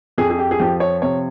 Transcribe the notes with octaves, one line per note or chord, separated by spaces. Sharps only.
F2 G#4
G#4
G4
G#4
F3 G4
C#5
C3 C#5